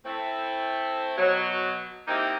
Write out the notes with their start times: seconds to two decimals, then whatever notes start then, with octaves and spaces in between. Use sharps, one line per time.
0.05 A3 C4 E4
1.18 B2 F#3
2.08 G#3 A#3 C4 D#4 E4 G4